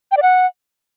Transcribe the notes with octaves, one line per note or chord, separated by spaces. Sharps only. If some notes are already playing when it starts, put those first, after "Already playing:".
G5
D5
F#5